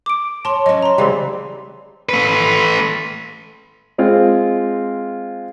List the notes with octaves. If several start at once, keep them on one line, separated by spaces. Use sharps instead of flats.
D6 D7
C#5 A5 C6
F#3 C#4 D#5
A#5 C6
C#3 E3 G3 G#3 C4
A3 B4
G#3 C4 F4